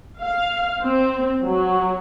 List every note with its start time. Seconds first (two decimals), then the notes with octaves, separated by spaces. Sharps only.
0.21 F5
0.81 C4
1.45 F#3